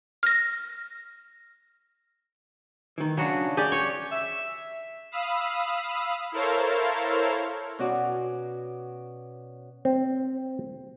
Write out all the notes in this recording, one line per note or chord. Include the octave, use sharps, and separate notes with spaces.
F6 A#6
D#3 E3
C#3 F#3 D4 F#4
G4 G#4 D5
C#5
E5
F5 B5 D#6 E6
E4 A4 A#4 C5 C#5 F5
B2 C#4 F#4 D5
C4